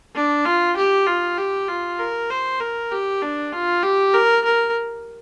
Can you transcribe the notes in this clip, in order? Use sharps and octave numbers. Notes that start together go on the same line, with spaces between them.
D4
F4
G4
F4
G4
F4
A#4
C5
A#4
G4
D4
F4
G4
A#4
A#4